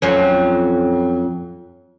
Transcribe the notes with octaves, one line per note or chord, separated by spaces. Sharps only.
F2 F#3 C#4